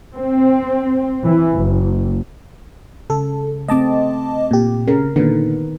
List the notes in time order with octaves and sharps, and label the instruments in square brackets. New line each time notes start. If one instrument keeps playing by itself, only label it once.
[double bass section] C4
E3
F#1
[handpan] C#3 [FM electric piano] A4
[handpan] A3 C4 [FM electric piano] D#5 A5 D6
[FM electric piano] A#2 G4
[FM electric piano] C#3 [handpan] A#4
[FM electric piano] A#2 D3 [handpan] D#3 B3 B4